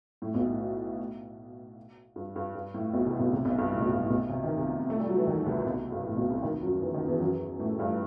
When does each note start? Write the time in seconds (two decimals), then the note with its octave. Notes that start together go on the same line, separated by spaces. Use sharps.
0.22 A2
0.34 B1 B2
0.47 A2
2.16 G2
2.36 G2
2.55 G2
2.74 A2
2.93 B1 B2
3.06 C2 C3
3.19 B1 B2
3.32 C2 C3
3.45 B1 B2
3.58 G2
3.72 A2
3.81 B1 B2
3.90 G2
4.00 A2
4.10 B1 B2
4.29 C3
4.44 D#3
4.57 C2 C3
4.90 A3
5.00 G3
5.09 F#3
5.17 E3
5.27 D#2 D#3
5.46 C2 C3
5.65 B1 B2
5.92 G2
6.04 A2
6.17 B1 B2
6.30 C2 C3
6.42 D#2 D#3
6.62 F#2 F#3
6.82 E2 E3
6.94 D#2 D#3
7.08 E2 E3
7.20 F#2 F#3
7.59 A2 A3
7.79 G2 G3